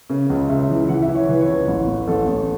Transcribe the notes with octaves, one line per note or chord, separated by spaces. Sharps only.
C#3
C#2
C#2 E5
E3
E3 F#5
E5
E3
C#5
E3 B4
C#5
C#2
B4
A1
A2
A1 A4
A1